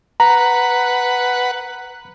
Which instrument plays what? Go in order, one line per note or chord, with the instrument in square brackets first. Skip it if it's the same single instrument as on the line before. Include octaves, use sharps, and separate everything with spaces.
[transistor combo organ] B4 F#5 [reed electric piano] A#5